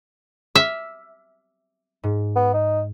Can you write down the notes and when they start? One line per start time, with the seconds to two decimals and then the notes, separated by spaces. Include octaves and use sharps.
0.56 E5 D6 F6
2.03 G#2
2.36 B3
2.54 D#4